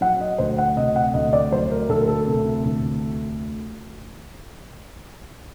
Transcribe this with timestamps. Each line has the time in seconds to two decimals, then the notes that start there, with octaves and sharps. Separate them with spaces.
0.01 F#3 F#5
0.21 D#5
0.38 D2 C5
0.58 F#5
0.76 C3 D#5
0.96 F#5
1.14 D2 D#5
1.33 D5
1.52 F#3 C5
1.71 A#4
1.89 D2 A4
2.00 A#4
2.08 A4
2.27 C3
2.65 D2